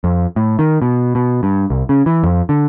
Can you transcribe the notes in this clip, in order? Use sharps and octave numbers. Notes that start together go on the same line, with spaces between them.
F2
A2
D#3
B2
B2
G2
C2
C#3
E3
F2
D3